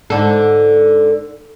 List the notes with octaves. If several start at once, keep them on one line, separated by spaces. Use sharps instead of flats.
G#2 D3 A4